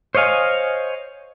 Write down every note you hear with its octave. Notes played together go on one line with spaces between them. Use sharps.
C5 C#5 D#5 F5 G#5